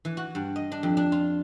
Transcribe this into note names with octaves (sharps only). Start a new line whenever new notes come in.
E3
F#4
G2
D#5
D4
F2
D4
F4